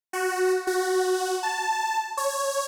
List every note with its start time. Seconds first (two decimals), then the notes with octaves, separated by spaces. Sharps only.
0.13 F#4
0.67 F#4
1.43 A5
2.17 C#5